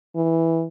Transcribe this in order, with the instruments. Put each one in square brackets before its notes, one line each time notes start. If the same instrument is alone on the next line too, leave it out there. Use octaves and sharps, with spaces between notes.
[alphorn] E3